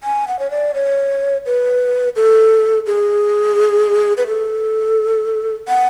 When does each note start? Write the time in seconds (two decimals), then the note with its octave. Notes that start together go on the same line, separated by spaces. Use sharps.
0.04 G#5
0.28 F#5
0.39 C#5
0.51 D5
0.74 C#5
1.46 B4
2.16 A4
2.86 G#4
4.17 B4
4.27 A4
5.68 F#5